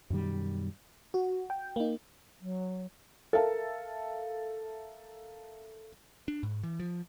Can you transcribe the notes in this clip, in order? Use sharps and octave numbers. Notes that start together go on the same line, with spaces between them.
F#2 B2 D#3 G3
F#4
G5
A#3 D#4
F#3
A4 A#4 E5 F5 A5
D4
G#2
E3
F3